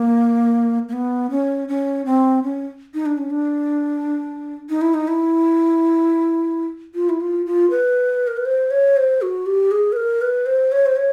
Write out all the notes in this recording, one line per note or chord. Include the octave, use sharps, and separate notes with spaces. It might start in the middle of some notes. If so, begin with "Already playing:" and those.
Already playing: A#3
A#3
B3
C#4
C#4
C4
C#4
D#4
D4
C#4
D4
D#4
E4
D#4
E4
F4
E4
F4
F4
B4
A#4
B4
C5
C#5
C5
F#4
G4
G#4
B4
A#4
B4
C5
C#5
C5
C#5